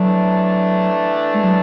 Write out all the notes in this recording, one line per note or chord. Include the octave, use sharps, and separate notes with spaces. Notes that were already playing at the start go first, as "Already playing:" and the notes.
Already playing: E3 F#3 A3 D4
G#3
F#3